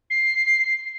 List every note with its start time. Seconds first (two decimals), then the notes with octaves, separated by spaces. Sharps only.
0.10 C7